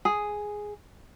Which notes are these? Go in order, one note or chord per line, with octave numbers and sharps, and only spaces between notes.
G#4